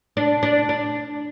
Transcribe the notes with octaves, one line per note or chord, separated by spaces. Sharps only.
D4
D4
D4